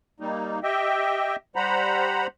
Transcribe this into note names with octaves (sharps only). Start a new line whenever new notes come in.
G3 A#3 D#4
G4 D#5 E5 G5
G3 C5 F#5 A#5 B5